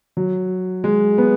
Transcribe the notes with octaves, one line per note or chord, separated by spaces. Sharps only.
F#3
G#3
B3